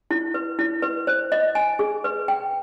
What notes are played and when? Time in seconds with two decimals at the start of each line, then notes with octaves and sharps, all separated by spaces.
0.11 E4
0.34 B4
0.59 E4
0.82 B4
1.07 C5
1.32 D#5
1.55 G#5
1.79 G#4
2.04 B4
2.28 G5